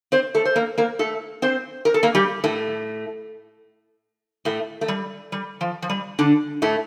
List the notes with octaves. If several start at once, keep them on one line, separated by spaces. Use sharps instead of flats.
C4 C5
A3 A4
C5
A#3 A#4
A#3 A#4
A3 A4
C4 C5
A#4
A4
A#3 A#4
G3 G4
A2 A3
A2 A3
A3
G3
G3
F3
F3
G3
D3 D4
A2 A3